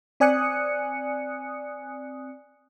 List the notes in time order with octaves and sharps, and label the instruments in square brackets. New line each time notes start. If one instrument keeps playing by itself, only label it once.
[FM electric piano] C4 D5 G#5 D#6 F#6 C#7